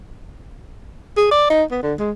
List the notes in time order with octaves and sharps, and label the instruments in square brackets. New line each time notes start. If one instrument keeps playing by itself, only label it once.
[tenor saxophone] G#4
D5
D#4
B3
D3
G#3